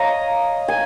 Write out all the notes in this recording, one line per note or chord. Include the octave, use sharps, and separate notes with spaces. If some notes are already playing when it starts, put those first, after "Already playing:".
Already playing: C#5 D#5 F5 A#5
G#5